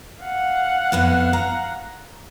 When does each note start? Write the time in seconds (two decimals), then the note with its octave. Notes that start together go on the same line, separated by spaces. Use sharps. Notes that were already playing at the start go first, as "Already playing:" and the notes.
0.22 F5 F#5
0.92 F2 B3 E4
1.33 A#5